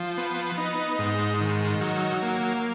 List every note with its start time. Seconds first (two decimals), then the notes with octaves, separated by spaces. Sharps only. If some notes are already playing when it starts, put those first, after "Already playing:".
Already playing: F3
0.18 B3
0.58 D#4
0.99 G#2
1.41 D#3
1.81 F#3
2.22 A#3